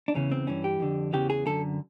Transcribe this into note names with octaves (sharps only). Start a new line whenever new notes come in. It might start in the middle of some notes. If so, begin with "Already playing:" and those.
D4
E2 C#3 E3 C#4
C4
G2 E3 C#4
G4
F2 D3
E2 C#3 E3 G4
G#4
F#2 D3 A4